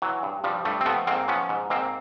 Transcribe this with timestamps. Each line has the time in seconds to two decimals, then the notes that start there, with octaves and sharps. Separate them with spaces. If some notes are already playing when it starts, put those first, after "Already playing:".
0.02 E3 F#3
0.23 G2
0.44 G2 F3 G3
0.65 G2 G3 A3
0.81 C4
0.86 F3 A3 B3
1.07 G#2 A#3 C4
1.28 F3 B3 C#4
1.49 G#2
1.70 G#2 A#3 C4